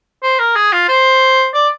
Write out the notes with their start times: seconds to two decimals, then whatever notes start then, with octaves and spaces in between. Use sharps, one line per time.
0.23 C5
0.39 A#4
0.56 G#4
0.73 F4
0.89 C5
1.54 D5